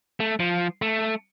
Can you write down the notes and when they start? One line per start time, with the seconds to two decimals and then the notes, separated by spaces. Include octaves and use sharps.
0.20 A3
0.40 F3
0.82 A3